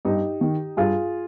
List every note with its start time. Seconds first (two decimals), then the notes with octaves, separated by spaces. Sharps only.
0.05 G2 D#4 G4
0.41 D#3
0.77 G2 F4 G#4